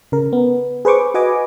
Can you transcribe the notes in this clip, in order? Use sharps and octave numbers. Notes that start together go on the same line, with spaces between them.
C#3 A#4
B3
G#4 B4 C5 C#6 D6
F#4 B4 D#5 G#5 D6